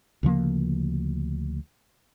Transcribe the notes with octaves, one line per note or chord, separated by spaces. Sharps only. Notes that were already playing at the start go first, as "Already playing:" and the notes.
D2 C#3 F3 A#3